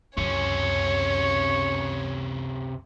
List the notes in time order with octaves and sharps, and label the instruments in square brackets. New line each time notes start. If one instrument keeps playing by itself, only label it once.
[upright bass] C#2 F#2 [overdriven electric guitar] C3 C#4 [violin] C#5 [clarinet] C#6